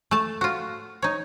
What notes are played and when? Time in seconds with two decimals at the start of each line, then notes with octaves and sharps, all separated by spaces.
0.11 A3 A5
0.41 F4 F#4
1.02 D#4 C#5